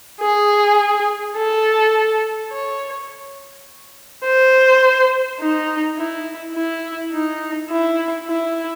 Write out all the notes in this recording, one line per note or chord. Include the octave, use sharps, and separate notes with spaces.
G#4
A4
C#5
C5
D#4
E4
E4
D#4
E4
E4